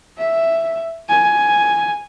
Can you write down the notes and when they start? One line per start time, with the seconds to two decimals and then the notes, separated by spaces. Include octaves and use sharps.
0.18 E5
1.09 G#5